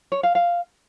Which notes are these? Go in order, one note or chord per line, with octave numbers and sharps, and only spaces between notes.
C#5
F5
F5